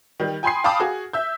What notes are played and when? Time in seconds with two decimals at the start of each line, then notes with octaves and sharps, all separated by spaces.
0.20 D#3 G3
0.43 G5 G#5 B5 C6 D#6 C7
0.64 F5 G5 A5 B5 D6 D#6
0.80 F#4 G#4
1.13 E5 E6 G6